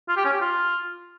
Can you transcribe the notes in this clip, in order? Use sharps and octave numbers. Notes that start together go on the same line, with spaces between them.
F4
G4
C#4
G4
F4